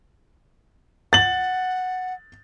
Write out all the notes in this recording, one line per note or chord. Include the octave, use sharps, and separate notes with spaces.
F#5 A6 F#7